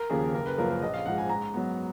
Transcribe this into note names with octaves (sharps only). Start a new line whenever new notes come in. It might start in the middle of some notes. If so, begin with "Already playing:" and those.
Already playing: A#4
D#2 C#3 F3 A#3 G#4
F#1 A#4
B4
F#2 F3 A#3 A#4
A#4
A#1 D#5
F5
G#2 F3 F#5
G#5
G#2 A#5
F#3 B3